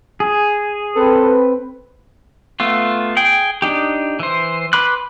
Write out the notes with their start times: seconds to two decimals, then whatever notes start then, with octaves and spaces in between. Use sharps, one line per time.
0.20 G#4
0.95 C4 A4 B4
2.60 A3 B3 F4
3.17 G#4 G5
3.62 D4 D#4 G4
4.19 E3 C5
4.73 B4 B5 C6 D6 F#6